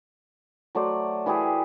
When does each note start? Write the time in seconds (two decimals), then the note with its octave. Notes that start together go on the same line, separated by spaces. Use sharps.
0.75 F#3 A3 C5 D5
1.26 E3 E4 G4 G#4